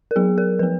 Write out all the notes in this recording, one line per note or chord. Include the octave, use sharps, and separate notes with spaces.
A#4
F#3 B3 G#4
A#4
F3 B3 B4